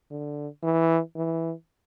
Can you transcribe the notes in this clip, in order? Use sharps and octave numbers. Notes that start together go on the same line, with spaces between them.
D3
E3
E3